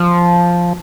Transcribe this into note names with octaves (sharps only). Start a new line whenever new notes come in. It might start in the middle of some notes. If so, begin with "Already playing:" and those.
Already playing: F3